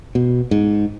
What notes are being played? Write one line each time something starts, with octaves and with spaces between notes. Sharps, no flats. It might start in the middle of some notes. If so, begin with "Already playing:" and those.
B2
G#2